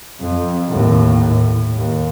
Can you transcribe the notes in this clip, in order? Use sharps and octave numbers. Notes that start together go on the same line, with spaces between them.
F2
D#2 A2
A2
D#2